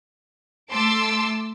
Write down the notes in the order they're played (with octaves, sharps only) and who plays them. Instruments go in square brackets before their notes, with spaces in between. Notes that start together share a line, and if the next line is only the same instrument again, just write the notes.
[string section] A3 A5 C6 D6 E6